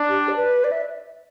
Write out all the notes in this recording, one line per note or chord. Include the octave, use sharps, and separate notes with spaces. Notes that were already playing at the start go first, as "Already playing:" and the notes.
Already playing: D4
G4
D5
B4
D5
E5